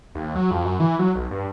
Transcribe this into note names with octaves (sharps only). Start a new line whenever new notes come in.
D#2
F#3
F2
F#2
E3
F#3
B1
G2